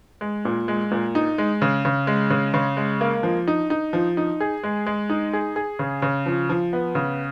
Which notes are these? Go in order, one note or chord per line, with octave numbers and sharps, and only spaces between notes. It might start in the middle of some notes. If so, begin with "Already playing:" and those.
G#3
A#2
G#3
A#2
D#4
G#3
C#3
C#3
G#3
C#3
C#3
G#3
A#3
F3
D#4
D#4
F3
D#4
G#4
G#3
G#3
D#4
G#4
G#4
C#3
C#3
F3
F3
B3
C#3